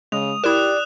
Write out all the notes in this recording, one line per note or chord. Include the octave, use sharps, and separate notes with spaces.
C#3 G#3 D#6 F7
E4 G4 A#4 D5 D#6 F#6 E7